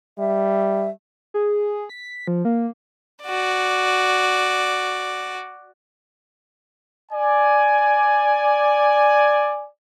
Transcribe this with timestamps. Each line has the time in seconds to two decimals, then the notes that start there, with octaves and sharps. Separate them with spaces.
0.19 G3 E5
1.34 G#4
1.89 B6
2.28 F3
2.45 A#3
3.23 F#4 D5
7.12 D5 G#5